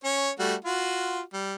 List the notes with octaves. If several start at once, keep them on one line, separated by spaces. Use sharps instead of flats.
C#4 C#5
G3 A3 F#4
F4 F#4
G3